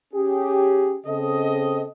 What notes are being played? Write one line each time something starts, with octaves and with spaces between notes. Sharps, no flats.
C#4 G4 G#4
C#3 C4 A4 D#5